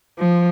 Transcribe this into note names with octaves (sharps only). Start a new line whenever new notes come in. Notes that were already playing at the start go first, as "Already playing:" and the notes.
F3